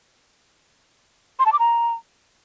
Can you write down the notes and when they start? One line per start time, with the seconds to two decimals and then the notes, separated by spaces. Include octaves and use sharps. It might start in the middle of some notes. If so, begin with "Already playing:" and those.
1.39 C6
1.46 A5
1.52 D6
1.59 A#5